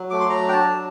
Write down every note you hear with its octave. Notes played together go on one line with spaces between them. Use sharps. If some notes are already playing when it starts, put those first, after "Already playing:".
Already playing: F#3
A3 D6
C6
F#3 A#5
D4 G5
A5
F#3